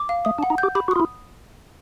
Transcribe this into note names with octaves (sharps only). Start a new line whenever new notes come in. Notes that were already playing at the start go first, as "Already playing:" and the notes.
Already playing: D6
F5
A3 D#6
D4
F#5
D#4
G6
G4
G4 B5
F#4
F4 D#6
E4